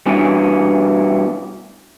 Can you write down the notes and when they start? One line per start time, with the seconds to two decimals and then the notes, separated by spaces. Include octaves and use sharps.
0.06 G2 B2 E3 C#4